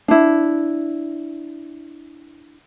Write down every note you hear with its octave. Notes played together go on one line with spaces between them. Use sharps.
D4 E4